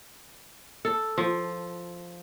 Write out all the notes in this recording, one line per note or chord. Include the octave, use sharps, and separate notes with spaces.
A4
F3